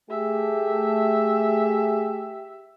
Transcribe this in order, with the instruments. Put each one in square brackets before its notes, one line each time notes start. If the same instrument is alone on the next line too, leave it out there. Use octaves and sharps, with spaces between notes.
[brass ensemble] A3 [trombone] G4 [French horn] G#4 [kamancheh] E5